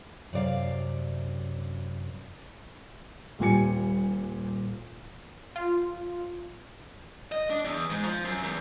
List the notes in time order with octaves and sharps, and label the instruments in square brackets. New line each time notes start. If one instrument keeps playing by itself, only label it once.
[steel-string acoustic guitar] F#2 C3 D5 F5
[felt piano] D#1 A#2 G3 G#5 C#7
[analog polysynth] F4
[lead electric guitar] D#5
D4
E2
G#2
F3
F#2
E2